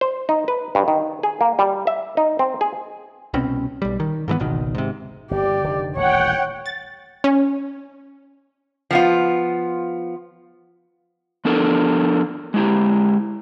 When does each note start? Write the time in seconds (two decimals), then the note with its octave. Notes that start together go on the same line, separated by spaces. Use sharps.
0.01 C5
0.29 D#4
0.48 B4
0.75 G2
0.88 D#3
1.23 G#4
1.41 A#3
1.59 G3
1.87 E5
2.17 D#4
2.39 C4
2.61 G#4
3.34 C2 B2 C4 C#4
3.82 B1 G3
4.00 D#3
4.28 G#2 E3 G#3 B3
4.40 G#1 C#2 B2 D#3
4.75 G#2 C3
5.31 G1 G4 D5
5.64 F1 D3 D#3
5.96 D#1 A1 C#5 F#5 G5
6.66 A6
7.24 C#4
8.91 F3 B3 F4
11.45 F3 B3 D4 A4 A#4
12.54 G#3 E4 G4